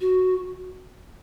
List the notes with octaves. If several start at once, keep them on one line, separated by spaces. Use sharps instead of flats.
F#4